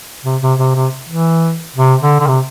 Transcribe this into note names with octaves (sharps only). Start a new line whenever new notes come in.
C3
C3
C3
C3
E3
C3
D3
D3
C3